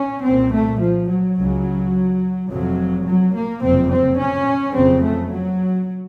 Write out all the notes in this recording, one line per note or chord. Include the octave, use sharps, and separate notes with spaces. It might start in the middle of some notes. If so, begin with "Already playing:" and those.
Already playing: C#4
C2 A#2 C4
A3
F3
F#3
C#2 C#3
F1 F2 C3 F#3
F#3
A#3
F#1 F2 C3 C4
C4
C#4
F#1 F2 C#3 C4
A3
F#3